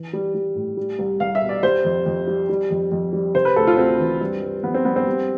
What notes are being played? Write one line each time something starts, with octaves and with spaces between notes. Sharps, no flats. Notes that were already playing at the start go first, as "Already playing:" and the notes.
Already playing: E3
G3
G3
A2
G3
C2
C2 F5
E5
B2
D5
G3 C5
F2
F2
G3
G3
F2
F2
G3
C3 C5
B4
D2 A4
F4
D2 C4
E3
G2
G2
F3 B3
C4
G2 B3
C4
G3